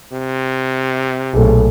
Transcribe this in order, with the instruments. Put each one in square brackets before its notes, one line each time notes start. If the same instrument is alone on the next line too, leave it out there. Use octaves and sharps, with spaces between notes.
[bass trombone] C3
[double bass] B1 A#2 [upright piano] A3 G#4